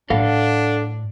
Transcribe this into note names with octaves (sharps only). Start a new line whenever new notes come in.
A2 D4 A4 F5 F#5